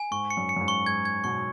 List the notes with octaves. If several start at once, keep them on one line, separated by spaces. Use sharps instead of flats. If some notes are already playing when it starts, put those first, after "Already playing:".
Already playing: G#5
G#2 C#6
C#7
F#2
C#7
F#2
G#2
C#6
G#2 G#6
G#6
B2 C#6